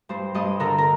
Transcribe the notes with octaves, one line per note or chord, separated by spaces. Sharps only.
G2 C5
G2 D#5
D3 A#4
A#4